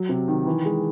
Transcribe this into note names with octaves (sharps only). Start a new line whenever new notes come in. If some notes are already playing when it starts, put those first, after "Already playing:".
Already playing: F#3
C3
D#3
E3
G#3